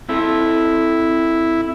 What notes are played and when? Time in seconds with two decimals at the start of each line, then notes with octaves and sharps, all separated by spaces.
0.09 C4 E4 A4 A5